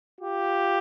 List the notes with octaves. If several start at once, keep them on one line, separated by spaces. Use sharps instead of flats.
F4 G4